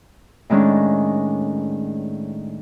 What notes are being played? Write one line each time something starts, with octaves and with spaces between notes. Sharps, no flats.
A2 D#3 G#3 C#4 D4